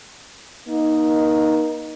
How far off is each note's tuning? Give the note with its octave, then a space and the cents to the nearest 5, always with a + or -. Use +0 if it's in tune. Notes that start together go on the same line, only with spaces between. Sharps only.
A#3 +35 D#4 +0